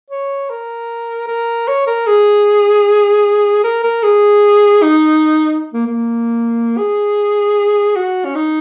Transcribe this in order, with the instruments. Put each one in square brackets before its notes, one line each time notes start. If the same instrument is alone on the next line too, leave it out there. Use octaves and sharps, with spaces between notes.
[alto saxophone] C#5
A#4
A#4
C#5
A#4
G#4
A#4
A#4
G#4
D#4
A#3
A#3
G#4
F#4
C#4
D#4